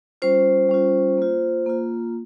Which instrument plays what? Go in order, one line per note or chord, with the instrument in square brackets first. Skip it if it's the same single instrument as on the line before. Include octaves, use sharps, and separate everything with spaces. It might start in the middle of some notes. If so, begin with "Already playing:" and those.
[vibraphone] G3 C#4 F4 C5
G3 C#4 F4
A#3 F4
A#3 F4